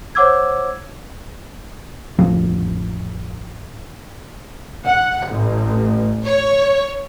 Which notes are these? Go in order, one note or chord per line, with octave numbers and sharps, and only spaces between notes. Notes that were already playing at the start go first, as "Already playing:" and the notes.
C5 C#5 F#5 D6 E6 G#6
A1 F2 F3
F#5
A1
C#5